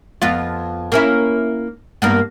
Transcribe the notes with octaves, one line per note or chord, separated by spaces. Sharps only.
F2 B3 F4
A#3 C#4 E4
G2 A#3 B3